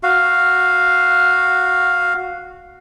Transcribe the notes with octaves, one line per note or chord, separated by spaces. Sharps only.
F#4 F5